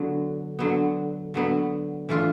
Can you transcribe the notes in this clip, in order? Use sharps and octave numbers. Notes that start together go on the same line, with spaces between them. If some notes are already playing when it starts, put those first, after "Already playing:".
Already playing: D3 F#3 B3
D3 F#3 B3
D3 F#3 B3
E3 A3 D4 F4